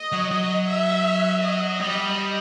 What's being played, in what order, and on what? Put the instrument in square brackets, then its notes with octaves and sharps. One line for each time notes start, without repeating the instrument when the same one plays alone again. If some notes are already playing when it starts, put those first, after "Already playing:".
Already playing: [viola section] D#5
[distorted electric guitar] F#3
[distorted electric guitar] F#3 [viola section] D#5
[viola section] E5
D#5
[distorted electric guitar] G3 [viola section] D#5